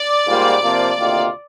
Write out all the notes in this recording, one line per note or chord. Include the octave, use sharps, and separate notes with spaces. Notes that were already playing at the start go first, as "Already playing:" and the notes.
Already playing: D5
G#2 G3 A#3 F4
C3 F3 A#3 F4
D2 C3 D#3 A#3 F4